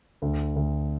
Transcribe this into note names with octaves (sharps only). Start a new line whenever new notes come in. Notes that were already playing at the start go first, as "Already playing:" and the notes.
D2
D2